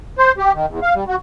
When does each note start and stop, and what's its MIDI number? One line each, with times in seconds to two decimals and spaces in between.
0.18 0.32 72
0.38 0.52 67
0.54 0.66 51
0.68 0.80 40
0.82 0.94 77
0.94 1.04 55
1.08 1.16 66